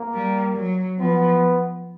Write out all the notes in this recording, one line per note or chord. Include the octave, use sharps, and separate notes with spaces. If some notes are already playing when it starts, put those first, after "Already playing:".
Already playing: A#3
G3
F#3
F3 B3